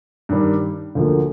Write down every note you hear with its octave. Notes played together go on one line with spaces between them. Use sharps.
G2 D#3 G3
D2 D3 F3 A#3